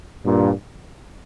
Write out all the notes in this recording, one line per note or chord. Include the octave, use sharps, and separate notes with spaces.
G2 A#2